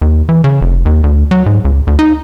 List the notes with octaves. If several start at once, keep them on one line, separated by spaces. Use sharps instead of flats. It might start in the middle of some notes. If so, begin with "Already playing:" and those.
D#2
E3
C#3
F1
D#2
D2
F#3
G#2
C#2
D2
D#4